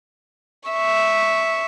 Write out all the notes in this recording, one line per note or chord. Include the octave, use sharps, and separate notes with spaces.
E5 C#6